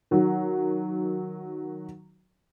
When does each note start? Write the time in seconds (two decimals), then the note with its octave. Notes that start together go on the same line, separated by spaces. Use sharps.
0.11 D#3 F#3